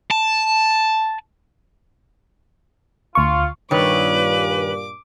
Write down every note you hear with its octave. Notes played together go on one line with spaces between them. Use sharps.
A5
D2 F4 C#6
G2 A#2 D#3 B4 C#5 D6